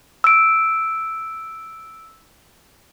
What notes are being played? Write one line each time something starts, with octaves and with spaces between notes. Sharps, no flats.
E6 D7